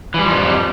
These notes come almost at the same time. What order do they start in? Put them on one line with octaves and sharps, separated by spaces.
E3 G3 F3 F2